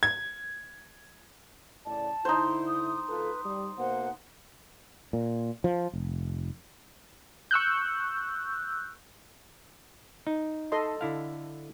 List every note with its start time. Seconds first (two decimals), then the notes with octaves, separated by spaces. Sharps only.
0.03 G#6
1.85 A2 C#3 D5 A5
2.25 D3 D#4 E4 C5
2.67 D#6
3.08 D2 F4 A4 B4
3.44 G3 D#6
3.78 B2 A#3 C5 F#5
5.13 A#2
5.64 F3
5.93 F1
7.51 C#6 E6 F#6 G6
10.27 D#4
10.72 A4 D#5 C6
11.01 D3 E4 F5